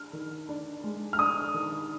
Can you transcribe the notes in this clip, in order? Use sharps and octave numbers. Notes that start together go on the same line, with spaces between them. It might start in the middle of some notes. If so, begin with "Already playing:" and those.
Already playing: D4 F6
D#3
D4
G#3
F6
D4 D#6
D#3